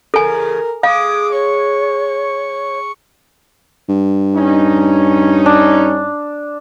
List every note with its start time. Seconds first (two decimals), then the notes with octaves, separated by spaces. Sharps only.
0.14 E2 C#3 A4 A#4 G#5
0.83 G#3 F5 D6 D#6
1.32 C#5 C#6
3.89 G2
4.35 C#4 D#4
5.46 D4